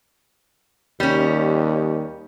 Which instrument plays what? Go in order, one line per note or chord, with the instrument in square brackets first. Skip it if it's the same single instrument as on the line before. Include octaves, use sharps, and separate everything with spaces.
[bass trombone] D#2 [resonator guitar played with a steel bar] G3 C#4